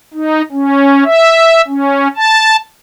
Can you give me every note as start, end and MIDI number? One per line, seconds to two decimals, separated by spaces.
0.14 0.42 63
0.52 1.04 61
1.05 1.61 76
1.68 2.08 61
2.16 2.56 81